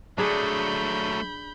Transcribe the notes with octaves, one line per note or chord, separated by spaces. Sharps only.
F#3 A3 D4 G#4 B5 G6